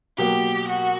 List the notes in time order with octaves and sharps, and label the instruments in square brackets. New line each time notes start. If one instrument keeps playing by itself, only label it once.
[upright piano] B2 F#3 A#3 [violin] G4
[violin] F#4